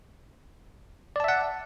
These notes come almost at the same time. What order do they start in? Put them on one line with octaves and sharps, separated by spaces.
D5 A5 E5 F#5